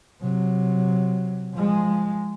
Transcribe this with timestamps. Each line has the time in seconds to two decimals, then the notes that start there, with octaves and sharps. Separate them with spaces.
0.21 C3 F#3
1.53 F3 G#3